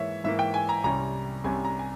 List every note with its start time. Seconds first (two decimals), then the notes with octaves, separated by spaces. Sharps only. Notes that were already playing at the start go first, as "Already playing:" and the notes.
Already playing: G#2 E3 A#3 C#5 E5
0.24 G#2 E3 A#3 E5
0.39 G5
0.54 G#5
0.69 A#5
0.84 C2 C3 G3 C#4 A#5
1.44 C2 C3 G3 C#4 G#5
1.65 A#5
1.79 G#5